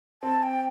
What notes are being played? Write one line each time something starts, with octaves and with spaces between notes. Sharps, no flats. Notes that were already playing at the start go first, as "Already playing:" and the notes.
C4 A5
G5